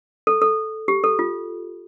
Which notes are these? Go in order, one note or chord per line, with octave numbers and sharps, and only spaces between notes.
A4
A4
G4
A4
F4